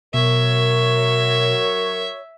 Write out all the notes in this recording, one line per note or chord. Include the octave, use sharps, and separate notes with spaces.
B2 F#3 F#4 A#4 C#5 E5